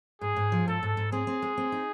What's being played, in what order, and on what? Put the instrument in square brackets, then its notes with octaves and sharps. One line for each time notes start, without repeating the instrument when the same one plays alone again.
[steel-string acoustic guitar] G#2 [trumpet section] G#4
[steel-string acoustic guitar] G#2
F3
[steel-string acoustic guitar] G#2 [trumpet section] A4
[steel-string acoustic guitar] G#2
G#2
[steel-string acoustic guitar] C4 [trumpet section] G#4
[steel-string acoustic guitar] C4
G#3
C4
D#4